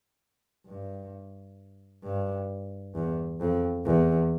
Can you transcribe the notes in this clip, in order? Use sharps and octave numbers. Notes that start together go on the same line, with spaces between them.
G2
G2
E2
F2
E2